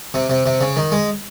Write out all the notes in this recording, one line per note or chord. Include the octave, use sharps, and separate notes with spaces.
C3
C3
C3
C#3
D#3
G#3